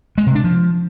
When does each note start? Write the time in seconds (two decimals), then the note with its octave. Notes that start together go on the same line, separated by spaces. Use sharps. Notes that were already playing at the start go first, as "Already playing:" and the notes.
0.18 G#3
0.26 C3
0.35 D4
0.44 F3